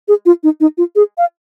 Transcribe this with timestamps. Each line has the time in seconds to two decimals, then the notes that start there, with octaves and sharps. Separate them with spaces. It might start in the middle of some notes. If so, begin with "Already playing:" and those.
0.08 G#4
0.26 F4
0.43 D#4
0.61 D#4
0.78 F4
0.96 G#4
1.18 F5